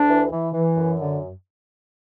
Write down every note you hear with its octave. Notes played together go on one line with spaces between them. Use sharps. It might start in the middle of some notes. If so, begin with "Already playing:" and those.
Already playing: D2 D4
E3
E3
E3
F#2
D3